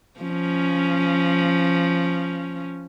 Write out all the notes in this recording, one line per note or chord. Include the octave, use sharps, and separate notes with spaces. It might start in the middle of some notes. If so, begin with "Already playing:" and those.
F3 C#4